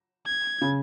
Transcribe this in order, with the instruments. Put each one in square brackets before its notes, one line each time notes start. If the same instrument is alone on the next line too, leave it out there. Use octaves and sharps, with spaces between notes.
[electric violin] G#6
[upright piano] C#3